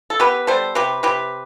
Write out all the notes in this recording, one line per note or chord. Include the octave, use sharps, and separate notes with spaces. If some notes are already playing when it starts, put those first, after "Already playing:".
A4
B3 G4 B4
G3 A4 C5
C3 G4 B4
C3 G4 B4